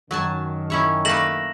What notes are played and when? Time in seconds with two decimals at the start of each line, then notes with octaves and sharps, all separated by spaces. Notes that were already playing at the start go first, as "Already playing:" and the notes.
0.11 F#2 D#3 F#3 G#5 A5
0.70 C#4 E4 C#5
1.05 A3 A#3 B4 A#6 E7 F#7